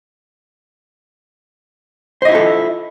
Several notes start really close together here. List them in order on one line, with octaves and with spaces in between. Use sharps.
C5 D#5 E4 F4 A4